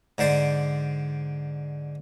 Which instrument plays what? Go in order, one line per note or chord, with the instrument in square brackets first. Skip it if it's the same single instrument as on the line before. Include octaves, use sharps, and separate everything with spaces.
[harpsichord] G#2 D3 C5 D5